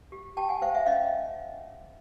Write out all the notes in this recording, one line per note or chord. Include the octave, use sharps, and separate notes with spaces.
G4
G4 G5 A5
F#5 G#5
C5 F5 G5
E5 F#5
C#4 D#5 F5